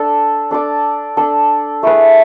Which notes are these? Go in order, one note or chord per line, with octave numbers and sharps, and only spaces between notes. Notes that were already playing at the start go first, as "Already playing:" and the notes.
Already playing: D4 A4 D5
D4 A4 D5
D4 A4 D5
A3 E4 G#4 B4